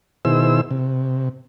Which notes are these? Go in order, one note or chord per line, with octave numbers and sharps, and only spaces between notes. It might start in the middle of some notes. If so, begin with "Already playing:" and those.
B2 D#3 E4 G#4 C5 E6
C3